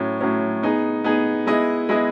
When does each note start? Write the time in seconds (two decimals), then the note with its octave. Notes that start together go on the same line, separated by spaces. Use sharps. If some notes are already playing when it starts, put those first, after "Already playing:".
Already playing: A2 F#3 C#4
0.21 A2 F#3 C#4
0.63 B3 D#4 G#4
1.04 B3 D#4 G#4
1.47 G#3 B3 E4 G#4 D#5
1.89 G#3 B3 E4 G#4 D#5